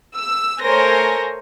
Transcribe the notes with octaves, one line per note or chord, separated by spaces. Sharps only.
E6
A3 A#4 C5 C#5 G#5 A#6